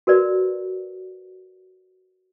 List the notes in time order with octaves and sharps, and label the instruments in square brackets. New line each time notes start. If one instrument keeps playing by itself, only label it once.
[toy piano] F#4 A#4 B4 D5